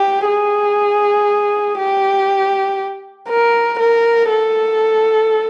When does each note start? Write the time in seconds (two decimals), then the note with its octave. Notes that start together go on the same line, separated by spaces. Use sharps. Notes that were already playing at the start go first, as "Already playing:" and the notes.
Already playing: G4
0.26 G#4
1.78 G4
3.29 A#4
3.79 A#4
4.30 A4